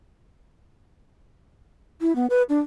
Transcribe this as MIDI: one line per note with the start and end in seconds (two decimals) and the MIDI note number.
2.01 2.15 64
2.16 2.26 59
2.30 2.42 71
2.49 2.59 62